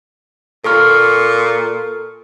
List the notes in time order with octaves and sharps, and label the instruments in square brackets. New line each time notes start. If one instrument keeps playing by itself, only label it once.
[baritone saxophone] A#2 [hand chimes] A4 C#6 F6